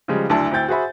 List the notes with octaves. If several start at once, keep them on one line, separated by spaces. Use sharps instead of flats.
C#3 F3 G3 G#3
F#1 D2 D4 E4 A5
D2 C4 E4 G5 G6 A6
F#4 G#4 C5 E5 B5